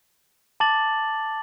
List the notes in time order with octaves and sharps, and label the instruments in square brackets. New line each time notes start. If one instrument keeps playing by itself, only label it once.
[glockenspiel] A5 D6 A6 F#7